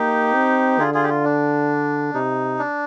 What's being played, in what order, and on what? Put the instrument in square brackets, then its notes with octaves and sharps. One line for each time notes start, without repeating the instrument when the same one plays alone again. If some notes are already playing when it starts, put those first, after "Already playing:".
Already playing: [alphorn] A#3 [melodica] D#4 G4
[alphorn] C4
[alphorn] D3 [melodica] F4 G#4
[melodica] F4 G#4
G4
F4
D4
[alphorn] C3 [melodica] D#4
[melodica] D4